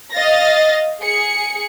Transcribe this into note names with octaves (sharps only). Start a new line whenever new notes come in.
D#5 F5 A6 A#6
G#4 C#7